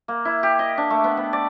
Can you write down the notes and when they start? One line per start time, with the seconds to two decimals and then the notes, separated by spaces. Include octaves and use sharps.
0.08 A#3
0.25 E4
0.43 G4
0.59 D#5
0.78 D4
0.90 A3
1.04 B3
1.17 B3
1.33 D5